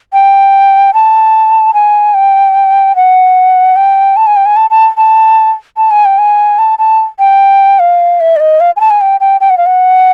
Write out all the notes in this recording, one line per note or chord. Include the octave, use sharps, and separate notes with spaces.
G5
A5
G#5
G5
F#5
G5
A5
G#5
G5
G#5
A5
A5
A5
A5
G#5
G5
G#5
A5
A5
G5
F5
E5
D5
D#5
F5
G#5
A5
G#5
G5
G5
G5
F#5
F5
F#5